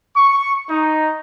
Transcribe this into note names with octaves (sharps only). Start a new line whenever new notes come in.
C#6
D#4